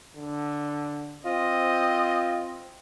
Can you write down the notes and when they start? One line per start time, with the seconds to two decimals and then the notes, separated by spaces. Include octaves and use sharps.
0.16 D3
1.25 C4 F4 D#5